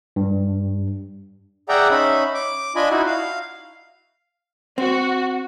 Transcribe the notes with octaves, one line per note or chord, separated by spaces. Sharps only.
G2
G#4 D5 E5 F#5 G5 A#5
C#4 D#4 E5 B5
D6
D4 F4 D#5 G#5 B5
D#4 E4 F#4
F5
C4 F#4